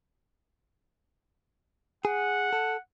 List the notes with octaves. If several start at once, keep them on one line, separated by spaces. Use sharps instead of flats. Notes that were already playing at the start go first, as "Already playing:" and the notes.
G#4 F#5
A4